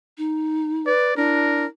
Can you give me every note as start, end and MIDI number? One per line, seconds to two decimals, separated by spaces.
0.18 0.87 63
0.86 1.16 71
0.86 1.13 74
1.16 1.66 62
1.16 1.66 64
1.16 1.67 70